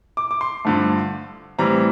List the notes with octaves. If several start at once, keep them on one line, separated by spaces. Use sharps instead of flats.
D6
D6
C6
G2 D3 F3 A3
A2 E3 G3 C4 A#5